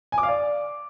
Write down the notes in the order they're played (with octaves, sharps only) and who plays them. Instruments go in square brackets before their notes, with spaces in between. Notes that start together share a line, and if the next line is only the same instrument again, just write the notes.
[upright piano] G#5
D6
F5
D5